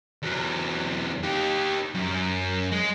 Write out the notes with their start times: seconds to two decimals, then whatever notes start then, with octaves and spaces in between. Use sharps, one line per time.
0.23 E2 F#3
1.23 D#4 G4
1.95 F#2
2.72 G#3